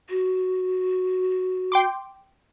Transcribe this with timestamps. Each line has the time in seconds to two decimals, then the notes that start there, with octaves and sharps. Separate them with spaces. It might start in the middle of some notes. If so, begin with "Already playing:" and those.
0.10 F#4
1.72 G5 C6 D6